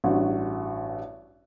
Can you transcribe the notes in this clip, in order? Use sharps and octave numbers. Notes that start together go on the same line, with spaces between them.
A1 G2 F#4